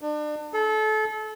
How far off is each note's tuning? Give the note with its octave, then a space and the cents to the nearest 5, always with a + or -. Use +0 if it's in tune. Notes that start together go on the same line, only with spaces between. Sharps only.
D4 +35
A4 -30